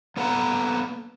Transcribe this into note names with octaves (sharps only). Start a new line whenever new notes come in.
A#3 B3 A4 B4 F#5 A#5